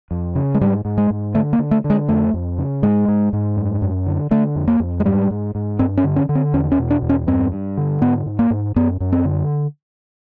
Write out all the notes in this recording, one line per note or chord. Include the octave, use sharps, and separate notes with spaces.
F2
C#3
G#3
G#2 G3
G#2
G#3
G#2
D3 A3
A#3
D3
A3
D3
G#3
F2 A3
F2
C#3
G#2 G#3
G#2
G#2
F#2
F#2
D3
D3 A3
F2
A#3
F2
G#3
G#2 G3
G#2
G#2
G2 C4
C#4
D3
C#4
D3
C4
E2 C#4
C#4
B2
D4
E2
C#4
G2 C4
G2
D3
G#2 B3
G#2
A#3
G#2
F#2 B3
F#2
C4
D3